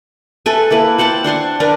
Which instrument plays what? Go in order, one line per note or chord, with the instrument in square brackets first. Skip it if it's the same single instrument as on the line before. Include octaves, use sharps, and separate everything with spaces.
[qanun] A4 B4 E5 G#5
A#3 E4 B4
C5 F#5 G5 A5
D4 C5 C6 C#6
D4 A#4 B4